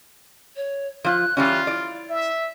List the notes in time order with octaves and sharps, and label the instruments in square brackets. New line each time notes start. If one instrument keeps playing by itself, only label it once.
[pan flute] C#5
[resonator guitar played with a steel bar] F3 F4 [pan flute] F#6
[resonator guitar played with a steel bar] E3 G3 C#4 [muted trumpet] F4 [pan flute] F#6
[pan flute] E4 [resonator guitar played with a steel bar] D5
[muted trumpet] E5